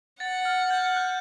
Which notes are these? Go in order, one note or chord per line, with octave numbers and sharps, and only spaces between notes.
F#5 A6
F6
G6
F#6